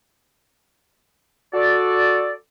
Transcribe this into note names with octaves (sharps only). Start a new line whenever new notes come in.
F#4 A4 D5